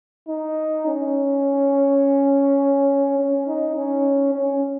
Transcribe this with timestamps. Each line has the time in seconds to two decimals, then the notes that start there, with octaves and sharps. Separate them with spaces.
0.28 D#4
0.87 C#4
3.18 C#4
3.47 D#4
3.76 C#4
4.34 C#4